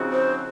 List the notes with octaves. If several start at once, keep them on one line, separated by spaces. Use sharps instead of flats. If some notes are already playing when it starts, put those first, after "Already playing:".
Already playing: C#3 F3 C4 D#4 F#4
C5